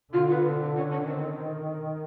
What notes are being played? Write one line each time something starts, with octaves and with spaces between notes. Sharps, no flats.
D3 F4
B3
C4
C4
C#4
C#4
D#3 C4